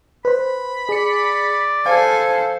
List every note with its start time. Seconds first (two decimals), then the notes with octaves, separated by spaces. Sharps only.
0.25 B4 C5 B5
0.89 G#4 D5 C#7
1.86 A4 C5 F5 G#5